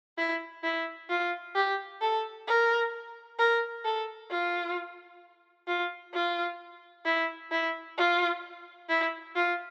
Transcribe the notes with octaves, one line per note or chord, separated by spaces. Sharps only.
E4
E4
F4
G4
A4
A#4
A#4
A4
F4
F4
F4
E4
E4
F4
E4
F4